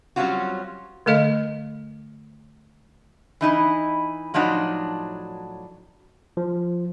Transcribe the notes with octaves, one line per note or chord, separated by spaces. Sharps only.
F#3 G3 C4 C#4 F4 F#4
D3 A3 A4 D#5 F5
E3 D#4 E4 D#5
A2 F3 F#3 D4 D#4 F#4
F3